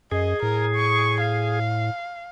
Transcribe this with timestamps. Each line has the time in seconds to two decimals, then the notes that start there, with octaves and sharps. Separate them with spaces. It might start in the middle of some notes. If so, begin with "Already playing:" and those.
0.12 F#2 G#4 D#5
0.42 A2 A#4
0.75 C#6
1.21 F5